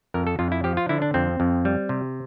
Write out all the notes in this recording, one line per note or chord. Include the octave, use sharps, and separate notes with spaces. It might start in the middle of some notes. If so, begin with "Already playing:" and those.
F2 A#4
A4
F2 F4
E4
F3 G4
F4
D3 E4
D4
F2 C4
F2
G3
C3